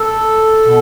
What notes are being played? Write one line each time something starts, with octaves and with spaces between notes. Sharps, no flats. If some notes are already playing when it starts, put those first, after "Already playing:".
Already playing: A4
B2